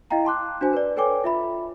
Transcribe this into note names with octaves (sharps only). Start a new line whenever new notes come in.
E4 D#5 F5 G5 A#5
A5 C6 D6 F#6
D4 F#4 C5 G#5
B4 D5
A4 B4 C#5 G5 G#5 D6
F4 E5 B5